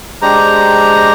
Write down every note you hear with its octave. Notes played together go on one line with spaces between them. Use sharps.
G#3 D4 G4 C5 A#5